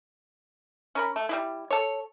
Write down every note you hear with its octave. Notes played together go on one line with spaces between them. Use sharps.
C#4 A#4 B5
A3
G3 G#3 E4
A4 C#5